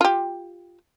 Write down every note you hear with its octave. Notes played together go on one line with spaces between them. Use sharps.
F4 G4